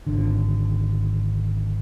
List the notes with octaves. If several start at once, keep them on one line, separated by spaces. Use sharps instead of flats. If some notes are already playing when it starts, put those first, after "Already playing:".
G#1 D3